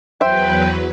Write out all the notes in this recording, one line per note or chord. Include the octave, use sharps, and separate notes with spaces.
E2 F#3 B4 C5 E5 G5